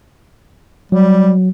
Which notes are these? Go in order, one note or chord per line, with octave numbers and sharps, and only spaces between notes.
F#3 G3